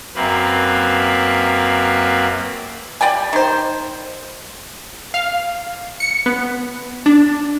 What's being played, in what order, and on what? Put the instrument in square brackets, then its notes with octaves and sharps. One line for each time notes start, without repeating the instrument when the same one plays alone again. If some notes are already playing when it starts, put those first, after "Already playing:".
[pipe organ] F#2 A#3 C4 B4
[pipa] G3 D5 G5 G#5
D#3 C5
[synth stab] F5
C#7
B3
D4